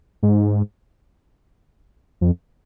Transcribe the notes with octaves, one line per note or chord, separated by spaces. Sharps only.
G#2
F2